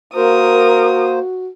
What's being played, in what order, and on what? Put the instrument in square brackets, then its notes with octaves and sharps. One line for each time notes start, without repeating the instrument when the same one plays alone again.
[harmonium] A#3 C5 [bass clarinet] F#4 [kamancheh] A#4 D#6